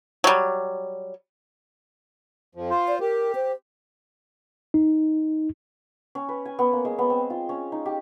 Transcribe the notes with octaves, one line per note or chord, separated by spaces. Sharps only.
F#3 G3
F2 F3
F4 C5
D5
G4 A#4
C5
D#4
C#4
B4
G#5
B3
A#3
G#3
B3
C4
F4
C#4
D#4
G4